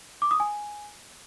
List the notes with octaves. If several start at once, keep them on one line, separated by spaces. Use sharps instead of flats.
D6
D#6
G#5